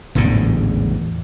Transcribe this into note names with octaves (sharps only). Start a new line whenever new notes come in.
A1 E2 G#2 D3